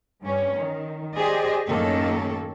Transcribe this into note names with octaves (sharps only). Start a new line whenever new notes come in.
G2 C#4
D#3
G4 G#4 C5 D5 D#5
F#2 A2 D#3 A#3 C#4 A4